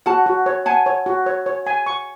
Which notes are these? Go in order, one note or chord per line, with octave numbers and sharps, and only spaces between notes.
F#4 F#5 A5
F#4
C#5
F#5 G#5 A5
C#5
F#4
C#5
C#5
G#5
C#6